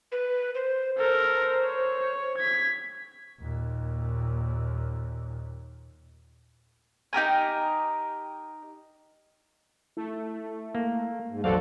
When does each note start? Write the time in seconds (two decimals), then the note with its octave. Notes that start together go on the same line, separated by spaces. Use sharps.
0.12 B4
0.55 C5
0.98 A4 A#4 C5
1.62 C#5
2.38 G#6 B6
3.40 D#2 A#2
7.13 D#4 G4 A#4 G#5
9.97 A3 E4
10.75 A#3
11.29 G#2
11.44 A1 E2 F#3 F#4 A4 C5 D5 F5